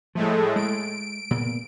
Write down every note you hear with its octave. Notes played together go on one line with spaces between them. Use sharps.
A2 F3 G#3 A3
G#3 D7
A#2 C#3 B3